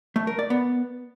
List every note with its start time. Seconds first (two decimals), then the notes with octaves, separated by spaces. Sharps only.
0.16 A3
0.27 A#4
0.39 D5
0.50 B3